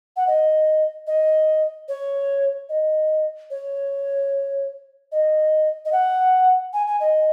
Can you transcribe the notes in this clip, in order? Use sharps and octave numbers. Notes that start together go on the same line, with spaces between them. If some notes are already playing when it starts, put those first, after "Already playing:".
F#5
D#5
D#5
C#5
D#5
C#5
D#5
D#5
F#5
G#5
G#5
D#5